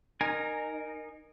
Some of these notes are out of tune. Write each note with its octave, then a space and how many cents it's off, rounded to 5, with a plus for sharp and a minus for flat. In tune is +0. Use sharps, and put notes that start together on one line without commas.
D#4 -25 A#4 +0 G#5 +0